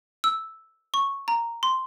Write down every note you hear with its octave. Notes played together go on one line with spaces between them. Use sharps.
E6
C#6
A#5
C6